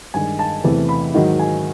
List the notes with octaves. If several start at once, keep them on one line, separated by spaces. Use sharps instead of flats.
G2 D#3 G#3 G#5
A5
E2 C3 E3 A3
B5
G#2 D#3 F#3
G#5